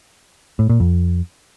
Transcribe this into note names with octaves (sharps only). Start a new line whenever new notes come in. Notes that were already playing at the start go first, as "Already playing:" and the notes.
A2
A#2
F2